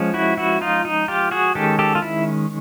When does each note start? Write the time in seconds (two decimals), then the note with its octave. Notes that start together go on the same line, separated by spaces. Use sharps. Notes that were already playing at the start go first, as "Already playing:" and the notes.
Already playing: F3 G#3 C#4
0.14 E4 F#4
0.38 E4 F#4
0.61 D#4 F4
0.85 D#4
1.08 F4 G4
1.31 F#4 G#4
1.55 D#3 G#3 C#4 G4 A4
1.79 G4 A4
1.95 F4
2.02 E4